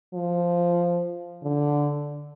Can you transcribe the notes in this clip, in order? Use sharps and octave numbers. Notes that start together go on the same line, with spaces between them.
F3
D3